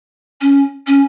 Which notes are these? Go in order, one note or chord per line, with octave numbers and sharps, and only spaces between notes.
C#4
C#4